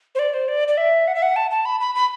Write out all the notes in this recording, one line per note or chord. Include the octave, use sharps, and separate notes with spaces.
C5
D5
C5
D5
D5
E5
F#5
E5
F#5
A5
A5
B5
B5
B5